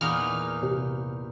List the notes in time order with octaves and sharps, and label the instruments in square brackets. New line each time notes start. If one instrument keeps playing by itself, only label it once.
[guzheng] E2 A#2 D#4 [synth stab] F6
[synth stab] C3